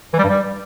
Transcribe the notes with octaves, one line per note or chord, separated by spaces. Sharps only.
E3
G3
G2
G3